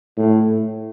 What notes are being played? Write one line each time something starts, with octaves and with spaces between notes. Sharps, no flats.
A2